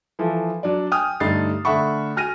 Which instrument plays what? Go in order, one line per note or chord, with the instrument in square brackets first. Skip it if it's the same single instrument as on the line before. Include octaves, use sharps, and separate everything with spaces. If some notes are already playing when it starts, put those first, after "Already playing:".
[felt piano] E3 F3 A4
F#3 D4 D5
G5 G#5 D#6 F6
G2 D3 A3 D#4 A6 C7
D3 A3 E5 F#5 B5 C#6
F#4 G#5 F6 A#6 D#7